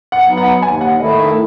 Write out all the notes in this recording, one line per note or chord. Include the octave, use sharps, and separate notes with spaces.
F#5
F#3 B3 D#4
F#5
D#2 G#5
F#5
D#3 A3 E4 D#5
E5